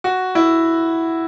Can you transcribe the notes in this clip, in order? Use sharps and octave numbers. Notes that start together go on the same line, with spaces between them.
F#4
E4